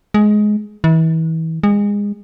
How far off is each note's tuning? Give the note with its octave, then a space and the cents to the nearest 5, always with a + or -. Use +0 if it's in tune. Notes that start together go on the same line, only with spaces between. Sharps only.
G#3 +15
E3 -35
G#3 -25